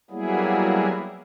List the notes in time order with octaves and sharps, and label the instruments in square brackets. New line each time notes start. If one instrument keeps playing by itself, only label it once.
[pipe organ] F#3 G3 A#3 B3 E4 G#4